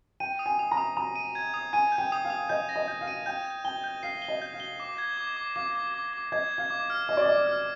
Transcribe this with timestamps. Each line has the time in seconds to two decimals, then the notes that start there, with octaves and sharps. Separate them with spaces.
0.20 G5 D#7
0.39 D#6
0.46 G#5
0.59 D#6
0.71 A#5
0.77 D#6
0.97 A#5 D#6
1.16 D#7
1.35 G#6
1.54 D#6
1.73 G#5 D#7
1.92 G6
1.98 G5
2.12 D#6
2.25 F5
2.30 D#6
2.49 D#5 G6
2.69 A#6
2.76 D#5
2.88 G6
3.01 F5
3.08 D#7
3.26 G5 G6
3.45 G6
3.65 G5 G7
3.84 G6
4.03 F5 C7
4.22 G7
4.28 D#5
4.42 G6
4.54 F5
4.60 G7
4.80 D6
4.98 G#6
5.17 D6
5.37 D6
5.56 F5 D6
5.75 D6
5.94 D6
6.13 D6
6.32 D#5 G#6
6.52 G#6
6.58 F5
6.70 D6
6.90 F6
7.09 D#5 D6
7.17 D5
7.26 D#5 D6
7.47 F6